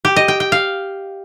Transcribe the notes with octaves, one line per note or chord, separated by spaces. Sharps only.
G4
D#5
G5
G5
F5